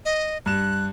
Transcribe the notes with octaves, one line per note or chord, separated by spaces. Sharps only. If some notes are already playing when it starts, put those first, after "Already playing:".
D#5
G2 F#6 E7